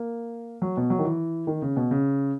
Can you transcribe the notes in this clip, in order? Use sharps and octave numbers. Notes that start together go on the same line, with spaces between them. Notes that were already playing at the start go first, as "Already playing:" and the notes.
Already playing: A#3
F#3
B2
F#3
D#3
E3
D#3
C#3
B2
C#3